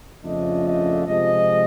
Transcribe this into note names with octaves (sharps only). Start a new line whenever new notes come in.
F2 C#3 F3 A3 D4 D#5
D#5
C3 F3 G#3 D#5